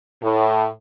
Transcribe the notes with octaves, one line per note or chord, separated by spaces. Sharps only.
A2